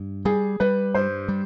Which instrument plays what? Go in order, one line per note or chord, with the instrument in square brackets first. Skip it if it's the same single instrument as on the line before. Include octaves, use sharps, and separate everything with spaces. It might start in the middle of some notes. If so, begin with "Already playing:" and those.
Already playing: [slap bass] G2
[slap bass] G3 [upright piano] G#4
[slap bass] G3 [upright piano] B4
[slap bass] G2 [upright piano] C5
[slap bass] G3